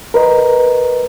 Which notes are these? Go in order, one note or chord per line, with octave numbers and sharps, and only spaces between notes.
A#4 B4 D#5